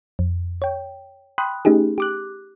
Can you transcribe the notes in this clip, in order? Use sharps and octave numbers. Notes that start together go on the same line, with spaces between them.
F2
C#5 G5
G5 B5 C6 D#6 F#6
A3 C#4 D#4 G4 G#4
G4 D6 F#6